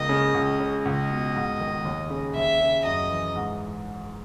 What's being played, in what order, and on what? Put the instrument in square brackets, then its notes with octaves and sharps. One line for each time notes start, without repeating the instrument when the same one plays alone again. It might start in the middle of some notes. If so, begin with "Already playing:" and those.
Already playing: [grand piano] C#2 A#3 [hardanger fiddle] D#5
[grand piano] C#3
C#2
C#3
[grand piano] C#2 [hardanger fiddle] D#5
[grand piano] B2
G#2
D#3
D#2
C#3
[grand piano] D#2 [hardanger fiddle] E5
[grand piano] C#3
[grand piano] F#2 [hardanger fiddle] D#5
[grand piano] E3
G#2